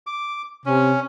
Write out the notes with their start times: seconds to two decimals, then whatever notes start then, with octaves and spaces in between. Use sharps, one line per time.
0.07 D6
0.66 C3 C#4